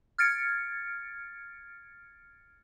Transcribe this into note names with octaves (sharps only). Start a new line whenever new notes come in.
F6 G#6 A6 C#7 D7